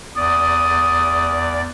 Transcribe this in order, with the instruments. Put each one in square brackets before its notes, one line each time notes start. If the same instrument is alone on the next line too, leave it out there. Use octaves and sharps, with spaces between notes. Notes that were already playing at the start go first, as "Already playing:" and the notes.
[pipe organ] E2 D5 [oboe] D#6